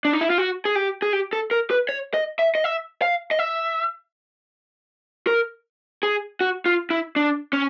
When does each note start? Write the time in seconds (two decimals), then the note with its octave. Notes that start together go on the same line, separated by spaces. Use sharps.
0.05 D4
0.13 D#4
0.21 E4
0.30 F4
0.38 F#4
0.65 G#4
0.76 G4
1.02 G#4
1.13 G4
1.33 A4
1.51 A#4
1.71 B4
1.89 C#5
2.14 D#5
2.39 E5
2.55 D#5
2.64 E5
3.02 F5
3.31 D#5
3.39 E5
5.27 A#4
6.03 G#4
6.41 F#4
6.66 F4
6.90 E4
7.16 D4
7.53 C#4